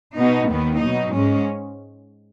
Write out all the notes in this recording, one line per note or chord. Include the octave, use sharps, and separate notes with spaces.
B2 B3 D#4
D#2 D#3 B3
B2 F#3 D#4
G#2 G#3 C#4